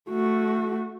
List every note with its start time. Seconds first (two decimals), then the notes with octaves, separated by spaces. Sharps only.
0.11 A3 F#4